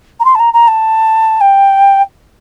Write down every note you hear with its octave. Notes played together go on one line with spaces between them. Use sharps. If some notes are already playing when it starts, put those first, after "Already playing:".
A#5
C6
A5
A#5
A#5
A5
G5